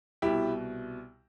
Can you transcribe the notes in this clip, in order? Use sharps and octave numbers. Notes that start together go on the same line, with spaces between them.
C2 B2 E4 G4